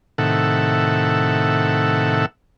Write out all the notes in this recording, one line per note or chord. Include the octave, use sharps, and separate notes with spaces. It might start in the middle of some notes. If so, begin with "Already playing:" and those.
A2 C3 D#3 A4 E5 F#5